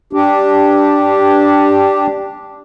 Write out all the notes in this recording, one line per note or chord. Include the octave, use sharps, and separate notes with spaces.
D4 G4